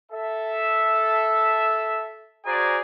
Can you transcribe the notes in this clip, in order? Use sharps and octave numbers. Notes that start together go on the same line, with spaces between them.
A4 E5
F#4 G#4 C5 D5 G#5 A#5